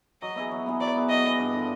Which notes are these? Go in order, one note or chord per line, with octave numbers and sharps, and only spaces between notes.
F#3 D#5
B3 E4 G#4
F#3
B3 E4 G#4
F#3 D5
B3 E4 G#4
F#3 D#5
B3 E4 G#4
G2
D3
F3